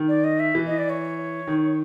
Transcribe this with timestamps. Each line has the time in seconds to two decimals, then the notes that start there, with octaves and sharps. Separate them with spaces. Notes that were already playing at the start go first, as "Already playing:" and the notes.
Already playing: D#3
0.08 D5
0.24 D#5
0.40 E5
0.55 E3
0.66 D#5
0.78 D5
0.90 C#5
1.47 D#3